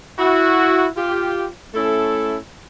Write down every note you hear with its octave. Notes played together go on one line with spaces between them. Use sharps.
E4 F#4
F4 G4
A3 C#4 E4 A4